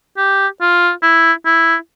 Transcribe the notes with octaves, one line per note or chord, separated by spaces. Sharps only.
G4
F4
E4
E4